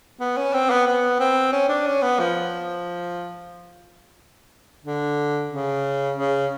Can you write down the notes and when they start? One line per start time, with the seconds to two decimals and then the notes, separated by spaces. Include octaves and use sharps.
0.21 B3
0.37 C#4
0.54 C4
0.70 B3
0.87 B3
1.20 C4
1.53 C#4
1.69 D4
1.86 C#4
2.03 B3
2.19 F3
4.84 D3
5.51 C#3
6.17 C#3